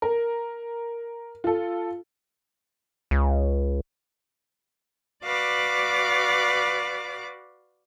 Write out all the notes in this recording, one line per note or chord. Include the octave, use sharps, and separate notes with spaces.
A#4
F4 A4
C#2
F#4 B4 D5 F5 D6